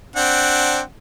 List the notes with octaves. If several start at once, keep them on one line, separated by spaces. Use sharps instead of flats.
C4 D4 F#5